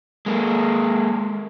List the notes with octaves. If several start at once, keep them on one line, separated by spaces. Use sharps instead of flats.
G#3 A#3